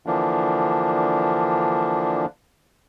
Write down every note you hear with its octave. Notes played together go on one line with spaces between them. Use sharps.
D3 E3 F3 A#3 D4